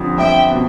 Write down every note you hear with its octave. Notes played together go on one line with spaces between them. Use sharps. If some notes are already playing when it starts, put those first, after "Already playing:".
Already playing: F2 D3 G3
F2 E5 G5
B2